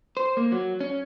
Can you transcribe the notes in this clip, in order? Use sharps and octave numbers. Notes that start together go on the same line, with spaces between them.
C5
A#3
F#3
C#4